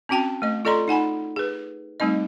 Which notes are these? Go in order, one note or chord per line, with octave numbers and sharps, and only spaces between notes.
C4 C#4 F#4 G5 A5
A3 D#5
F4 A4 D5 D#5 A#5 C6
D#4 F#5 G#5 B5
G#4 B4
G3 A3 C4 D#4 D#5